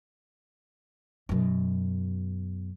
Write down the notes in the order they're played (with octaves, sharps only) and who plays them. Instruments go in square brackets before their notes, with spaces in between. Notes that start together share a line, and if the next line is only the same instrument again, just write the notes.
[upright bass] F#2 B2